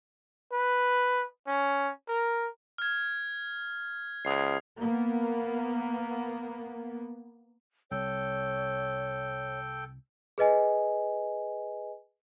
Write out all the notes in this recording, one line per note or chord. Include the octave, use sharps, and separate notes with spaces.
B4
C#4
A#4
F6 G#6
C#2 D#6 C7
A#3 B3
C2 A4 C#5 G5
G#4 B4 D#5 G#5